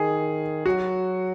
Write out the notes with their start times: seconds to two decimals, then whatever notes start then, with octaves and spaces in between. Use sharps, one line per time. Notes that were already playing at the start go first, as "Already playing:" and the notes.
Already playing: D#3 G#4
0.66 F#3 F#4